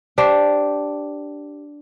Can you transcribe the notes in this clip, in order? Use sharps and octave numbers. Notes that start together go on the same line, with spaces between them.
D4 G4 C5